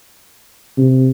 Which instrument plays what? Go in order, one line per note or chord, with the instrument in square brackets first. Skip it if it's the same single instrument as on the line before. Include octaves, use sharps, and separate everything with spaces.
[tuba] C3